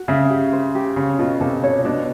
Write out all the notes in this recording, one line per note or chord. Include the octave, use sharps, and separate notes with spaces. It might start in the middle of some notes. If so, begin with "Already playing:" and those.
Already playing: F#4
C#3 E5
G4
C5
G4
C#3 C#5
B2 F4
C3 A4
C#5
B2 D4